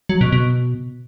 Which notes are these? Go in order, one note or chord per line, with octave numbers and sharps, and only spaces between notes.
F#3
B2
B2